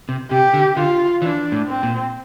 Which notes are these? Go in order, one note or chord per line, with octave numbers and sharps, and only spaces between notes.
C3
C3 G4
D3
D3 F4
E3 D4
A2
C4
A#2